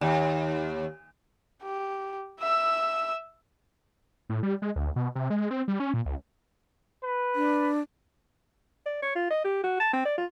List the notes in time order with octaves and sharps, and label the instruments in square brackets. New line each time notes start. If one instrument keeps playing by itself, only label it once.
[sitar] D#2
[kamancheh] G4
E5 E6
[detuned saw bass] A2
G3
G#3
D2
B2
C3
G#3
C4
G3
C#4
A#2
C#2
[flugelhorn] B4
[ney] D4
[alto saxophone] D5
C#5
F4
D#5
G4
F#4
A5
C4
D5
F4